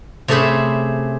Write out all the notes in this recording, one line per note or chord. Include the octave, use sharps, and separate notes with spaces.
C3 A3 C#4 G#4 C5 B5